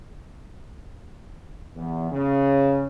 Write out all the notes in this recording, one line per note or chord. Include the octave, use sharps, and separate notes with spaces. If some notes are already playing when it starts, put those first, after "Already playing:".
E2
C#3